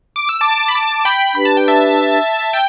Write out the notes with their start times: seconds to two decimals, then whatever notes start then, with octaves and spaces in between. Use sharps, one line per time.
0.16 D6
0.29 E6
0.41 A5 D6
0.68 B5
0.75 A5 D6
1.05 G5 B5
1.35 D4 G4 B4 B5
1.45 A5
1.57 G5
1.68 E5 A5
2.53 G5